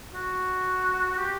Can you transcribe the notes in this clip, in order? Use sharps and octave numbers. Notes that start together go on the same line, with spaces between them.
F#4
G4